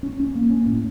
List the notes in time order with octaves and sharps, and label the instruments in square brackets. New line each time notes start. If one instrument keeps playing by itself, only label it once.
[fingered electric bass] C#4
C#4
A#3
C#4
A2